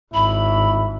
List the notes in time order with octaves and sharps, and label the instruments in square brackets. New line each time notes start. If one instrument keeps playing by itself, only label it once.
[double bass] G#1 [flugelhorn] E4 [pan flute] B5